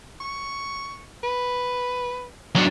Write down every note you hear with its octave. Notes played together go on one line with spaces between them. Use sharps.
C#6
B4
F#3 D4